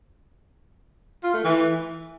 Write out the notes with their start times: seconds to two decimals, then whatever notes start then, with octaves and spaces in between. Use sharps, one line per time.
1.23 F4
1.34 A3
1.44 E3